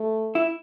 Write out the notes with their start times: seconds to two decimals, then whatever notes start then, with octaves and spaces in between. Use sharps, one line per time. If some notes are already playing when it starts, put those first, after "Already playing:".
Already playing: A3
0.35 E4